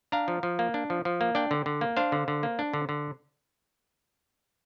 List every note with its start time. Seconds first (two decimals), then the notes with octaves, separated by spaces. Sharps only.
0.12 D4 F5 A#5
0.28 F3
0.43 F3
0.59 A#3
0.74 D4
0.90 F3
1.05 F3
1.21 A#3
1.35 D4 D5 G5
1.51 D3
1.66 D3
1.81 A#3
1.97 D4 C5 F5
2.12 D3
2.28 D3
2.43 A#3
2.59 D4
2.74 D3
2.89 D3